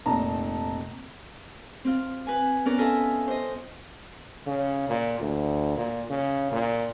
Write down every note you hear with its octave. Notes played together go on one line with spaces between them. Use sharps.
F1 A#2 A5 A#5
C4 F4
B4 G#5
B3 C#4 G#4 A#4 D5
F4 A4 D#5 E5 G#5 B5
C5 D#5
C#3
A#2
D2
A#2
C#3
A#2